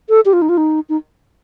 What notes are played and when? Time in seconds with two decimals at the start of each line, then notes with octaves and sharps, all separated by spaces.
0.09 A4
0.25 G4
0.33 F4
0.42 D#4
0.49 F4
0.57 D#4
0.89 D#4